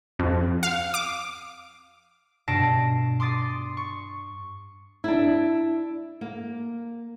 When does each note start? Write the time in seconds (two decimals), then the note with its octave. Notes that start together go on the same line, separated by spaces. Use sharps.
0.19 F2
0.63 F5
0.94 D6
2.48 G2 B2 A5 A#6 C7 D7
3.20 C6 D6 D#6 A6 C7
3.77 C#6
5.04 D4 E4
6.21 A#3